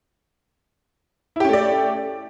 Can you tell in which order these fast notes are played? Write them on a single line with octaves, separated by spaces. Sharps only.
E4 G4 C#4 A3 D5